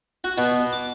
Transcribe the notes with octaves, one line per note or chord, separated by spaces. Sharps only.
F#4
B2
D6